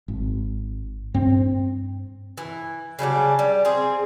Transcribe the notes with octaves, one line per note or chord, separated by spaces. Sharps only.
G#1
G2 C4
E3
C#3 F#3 G3 D4
G3
C4 G#4